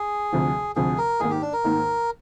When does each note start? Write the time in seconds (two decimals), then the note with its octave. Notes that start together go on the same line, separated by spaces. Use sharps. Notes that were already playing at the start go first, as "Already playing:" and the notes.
Already playing: G#4
0.32 D2 C3 F3
0.76 D2 C3 F3 G#4
0.98 A#4
1.20 G#2 D#3 A#3 G#4
1.30 G4
1.42 D4
1.53 A#4
1.64 G#2 D#3 A#3